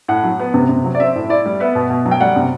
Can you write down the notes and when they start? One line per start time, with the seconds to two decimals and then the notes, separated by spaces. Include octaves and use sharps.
0.08 A2 F#5
0.23 F#3
0.39 B3
0.54 C3
0.69 C3
0.84 F#3
0.95 D5
0.99 C4 E5
1.15 A2
1.29 E4 D5
1.46 G3
1.60 B3 E5
1.75 B2
1.90 B2
2.06 F#3
2.11 G5
2.21 G3 F#5
2.36 C3